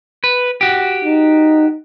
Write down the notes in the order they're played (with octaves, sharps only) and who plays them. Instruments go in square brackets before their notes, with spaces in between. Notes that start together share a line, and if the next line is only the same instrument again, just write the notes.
[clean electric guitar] B4
F#4 G4
[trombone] D#4